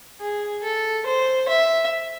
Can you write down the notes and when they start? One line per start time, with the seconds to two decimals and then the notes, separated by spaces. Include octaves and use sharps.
0.21 G#4
0.63 A4
1.06 C5
1.48 E5